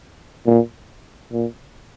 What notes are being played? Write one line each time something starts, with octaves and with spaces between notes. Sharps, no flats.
A#2
A#2